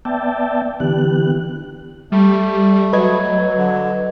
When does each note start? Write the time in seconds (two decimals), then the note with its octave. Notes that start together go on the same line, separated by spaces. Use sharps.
0.05 B3 D5 E5 G5 A5
0.80 D3 E3 B3 G4 F#6
2.12 G3 A3
2.93 F#3 B4 D#5 G#6
3.57 D3